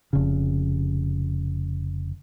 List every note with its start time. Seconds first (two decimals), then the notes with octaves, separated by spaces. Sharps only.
0.13 F1 C#3